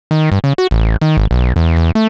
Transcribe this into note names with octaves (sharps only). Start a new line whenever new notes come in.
D#3
G2
C#3
F#4
A1
D#3
G#1
B1
E2
E2
A3